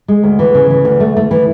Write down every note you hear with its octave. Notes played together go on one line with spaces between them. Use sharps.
G#3
D2
E3
C#3
E3
D2
A3
A3
E3